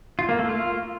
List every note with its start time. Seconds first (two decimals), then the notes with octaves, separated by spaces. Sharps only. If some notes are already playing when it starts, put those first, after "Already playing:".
0.19 F4
0.29 A#3
0.39 A3
0.49 F4